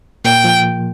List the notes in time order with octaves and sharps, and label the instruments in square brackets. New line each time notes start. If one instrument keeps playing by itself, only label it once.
[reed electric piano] A#2 A#3 [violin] G5
[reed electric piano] F3